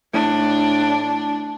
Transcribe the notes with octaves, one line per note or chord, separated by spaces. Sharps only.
A2 D4